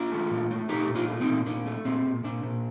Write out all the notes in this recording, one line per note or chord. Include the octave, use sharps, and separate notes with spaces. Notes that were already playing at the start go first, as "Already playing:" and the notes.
Already playing: D4 F4
A3
A#2
A3
A3 D#4 G4
A#2
D4 F4
A3
C4 D#4
A#2
A#2 D4
A3
A#2 C4
A#2
A#2 D4
A#2